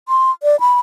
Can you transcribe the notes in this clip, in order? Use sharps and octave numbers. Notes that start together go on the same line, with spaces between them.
C6
D5
B5